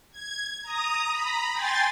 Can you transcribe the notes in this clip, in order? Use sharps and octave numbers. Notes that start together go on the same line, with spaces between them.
G#6
A#5 D#6
A#5 B5
G5 G#5 C6 A6